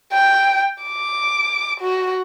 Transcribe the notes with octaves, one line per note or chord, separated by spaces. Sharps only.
G5
D6
F#4